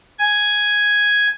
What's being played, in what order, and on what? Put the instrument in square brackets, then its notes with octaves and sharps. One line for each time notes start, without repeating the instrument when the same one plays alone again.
[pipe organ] G#5